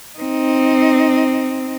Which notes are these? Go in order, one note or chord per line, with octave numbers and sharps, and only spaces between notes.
C4 D#4